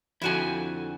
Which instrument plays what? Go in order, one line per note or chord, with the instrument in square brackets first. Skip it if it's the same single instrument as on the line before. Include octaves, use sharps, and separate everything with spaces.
[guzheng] F2 D3 C4 [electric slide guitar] E4 F#4 G#5